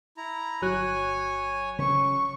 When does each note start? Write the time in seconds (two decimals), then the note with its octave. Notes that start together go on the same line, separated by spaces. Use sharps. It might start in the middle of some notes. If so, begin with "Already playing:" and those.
0.17 E4 A#5
0.62 G1 F#3 C#5 G#5 F#6
1.79 C#3 C#6